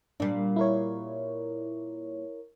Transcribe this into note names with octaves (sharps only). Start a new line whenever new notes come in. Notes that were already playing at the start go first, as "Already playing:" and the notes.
A#2 G3 D4
E4 A#4 C#5